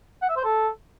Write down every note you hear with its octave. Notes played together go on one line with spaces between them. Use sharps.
F#5
E5
C5
A4